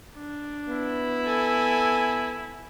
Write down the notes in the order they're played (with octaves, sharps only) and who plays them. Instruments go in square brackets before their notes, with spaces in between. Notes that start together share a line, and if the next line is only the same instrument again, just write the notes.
[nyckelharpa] D4
[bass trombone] B3 [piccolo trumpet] E4
[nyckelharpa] A4 G#5